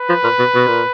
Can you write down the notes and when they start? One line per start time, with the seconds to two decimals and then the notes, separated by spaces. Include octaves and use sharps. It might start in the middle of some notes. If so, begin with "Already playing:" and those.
Already playing: B4
0.09 F3
0.23 A#2
0.39 B2
0.55 B2
0.68 A#2